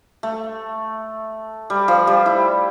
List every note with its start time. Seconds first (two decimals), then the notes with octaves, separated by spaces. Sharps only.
0.23 A3
1.70 G3
1.88 F3
2.07 G3
2.26 E4